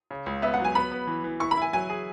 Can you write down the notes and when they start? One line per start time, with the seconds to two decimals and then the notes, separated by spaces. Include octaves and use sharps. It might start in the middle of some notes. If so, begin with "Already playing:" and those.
0.11 C#3
0.26 C#2
0.42 B3 E5
0.54 F#5
0.60 F#3 G#5
0.75 B3 B5
0.92 B3
1.07 E3
1.24 E3
1.40 E4 C#6
1.51 B5
1.57 E4 G#5
1.73 F#3 G#5
1.90 G#4